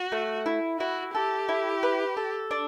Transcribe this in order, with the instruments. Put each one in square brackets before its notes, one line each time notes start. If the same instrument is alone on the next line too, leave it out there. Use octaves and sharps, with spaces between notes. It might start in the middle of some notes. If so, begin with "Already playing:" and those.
Already playing: [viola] F#4
[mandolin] A3
E4
[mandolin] E4 [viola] F#4
[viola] G4 [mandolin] A4
[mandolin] E4
B4
A4
D4